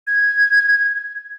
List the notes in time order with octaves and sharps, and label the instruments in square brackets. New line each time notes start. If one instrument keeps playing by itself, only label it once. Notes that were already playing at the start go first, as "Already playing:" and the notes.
[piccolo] G#6